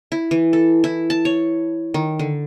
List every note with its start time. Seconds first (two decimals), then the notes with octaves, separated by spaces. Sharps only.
0.12 E4
0.31 E3
0.53 A4
0.84 E4
1.10 A5
1.25 C#5
1.94 D#3
2.19 D3